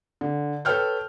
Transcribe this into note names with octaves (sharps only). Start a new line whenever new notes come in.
D3
A4 B4 C#5 G5 F6 G6